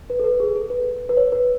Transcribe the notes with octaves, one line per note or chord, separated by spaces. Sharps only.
B4
A4
B4
G#4
A4
B4
B4
C#5
B4